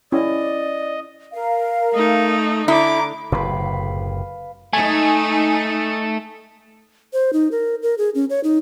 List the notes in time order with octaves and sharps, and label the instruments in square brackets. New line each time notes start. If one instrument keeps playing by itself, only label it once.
[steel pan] C#4 E4 [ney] D5 [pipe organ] D#5
[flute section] A#4 F5
[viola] A3 D#4
[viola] D3 D6 [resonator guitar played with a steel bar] E4 [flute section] A#5
[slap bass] F#1 A2 C3 [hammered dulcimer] B4 F5
[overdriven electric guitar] A3 [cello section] D#4 [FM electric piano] G#5
[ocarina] C5
D#4
A#4
A#4
G#4
C#4
C#5
D#4